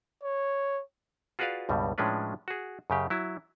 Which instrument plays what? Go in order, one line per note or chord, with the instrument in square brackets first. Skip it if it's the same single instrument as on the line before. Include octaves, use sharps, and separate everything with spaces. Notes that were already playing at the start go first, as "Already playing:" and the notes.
[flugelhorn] C#5
[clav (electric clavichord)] F4 F#4 G#4 B4 D5 F5
C#2 G2 B2 G3
A2 F3 G#3 C#4 D4 B4
F#4 G#4
F#2 C#3 G4
F#3 E4